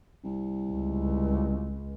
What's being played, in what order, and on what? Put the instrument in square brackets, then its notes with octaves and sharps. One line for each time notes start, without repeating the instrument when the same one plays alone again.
[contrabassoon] C2
[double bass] C#2